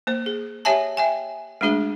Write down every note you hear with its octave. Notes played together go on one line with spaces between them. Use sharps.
A#3 C5
G#4
G4 C#5 E5 G#5 A5
E5 G5 G#5
G#3 A3 D4 F#4 G#4